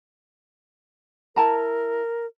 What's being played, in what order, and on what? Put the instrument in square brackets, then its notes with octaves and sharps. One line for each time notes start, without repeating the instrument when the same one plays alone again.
[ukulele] E4 A5 A#5 [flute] A#4